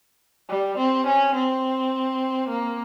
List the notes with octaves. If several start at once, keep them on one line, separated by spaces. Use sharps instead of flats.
G3
C4
C#4
C4
A#3